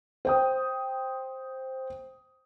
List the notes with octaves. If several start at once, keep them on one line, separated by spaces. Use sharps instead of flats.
C5 G5 D#6